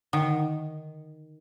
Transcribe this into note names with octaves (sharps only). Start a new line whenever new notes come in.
D3 D#3 F#5